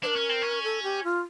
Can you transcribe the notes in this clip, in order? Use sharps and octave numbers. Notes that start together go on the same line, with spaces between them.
D4 A#4 C5
C#4
C4
C#4
A4
G4
F4